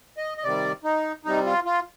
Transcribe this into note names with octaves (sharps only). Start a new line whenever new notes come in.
D#5
D#5
C3 D#3 G3 D5
D#4
C3 G3 D#4
F4
F4